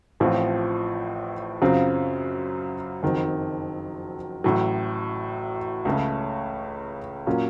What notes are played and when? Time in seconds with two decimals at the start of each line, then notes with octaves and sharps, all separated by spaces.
0.20 A1 A2 F3 C4 F4
1.62 F#2 C#3 F#3 C4 F4
3.03 F#1 F2 D#3 F#3 C4
4.44 A1 A2 F#3
5.85 C#2 C#3 A3 C#4
7.27 A#2 F#3 A#3 C#4